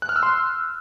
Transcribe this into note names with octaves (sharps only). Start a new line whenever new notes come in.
F#6
F6
E6
C6